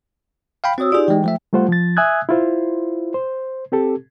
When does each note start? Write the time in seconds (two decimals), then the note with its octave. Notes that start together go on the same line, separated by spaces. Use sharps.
0.64 F5 G5 B5
0.78 C4 F#4 C#5 D#6 E6
0.92 D#4 F4 G4 G#4 D5
1.08 E3 G#3 G5
1.24 F3 A3 E5
1.53 G3 A3 F4 C5 F#5
1.69 F3 A6
1.97 E5 G#5 D#6 E6 F#6 G#6
2.29 E4 F4 C5
3.14 C5
3.72 C4 G4 A4